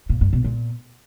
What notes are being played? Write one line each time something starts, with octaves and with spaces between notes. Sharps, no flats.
A#2
G2
B2
A#2